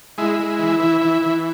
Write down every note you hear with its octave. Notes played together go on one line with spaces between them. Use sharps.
G#3 E4
G#3
E3
E3
E3
E3